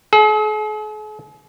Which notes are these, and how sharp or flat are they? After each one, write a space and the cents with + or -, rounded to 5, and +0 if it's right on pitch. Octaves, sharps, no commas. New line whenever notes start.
G#4 +45